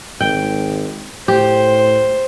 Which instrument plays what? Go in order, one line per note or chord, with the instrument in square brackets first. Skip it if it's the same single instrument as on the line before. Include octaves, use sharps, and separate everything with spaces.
[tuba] G#1 [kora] G5
[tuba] A2 [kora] G4 [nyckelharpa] C5